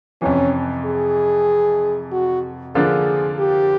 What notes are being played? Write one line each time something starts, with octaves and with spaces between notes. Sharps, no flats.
F2 C3 E3 C#4
G#4
F#4
D3 F3 A#3 D4 F4 G#4
G4